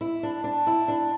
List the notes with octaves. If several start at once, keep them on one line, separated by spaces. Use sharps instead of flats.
E4
D4
D4
E4
D4